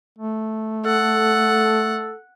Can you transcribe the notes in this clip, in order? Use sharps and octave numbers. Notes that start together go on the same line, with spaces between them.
A3
A4 F#5